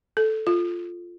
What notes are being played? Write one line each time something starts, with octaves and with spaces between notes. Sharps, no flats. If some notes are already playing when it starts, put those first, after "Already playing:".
A4
F4